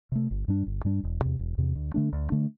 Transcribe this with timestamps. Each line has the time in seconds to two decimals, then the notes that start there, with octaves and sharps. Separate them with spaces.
0.12 C3 A3
0.31 G1
0.48 G2 G3 D4
0.66 G1
0.85 G2 G3 D4
1.03 E1
1.21 E2 C3
1.39 E1
1.58 E2 C3
1.75 D2
1.94 D3 A3 D4
2.13 D2
2.30 D3 A3 D4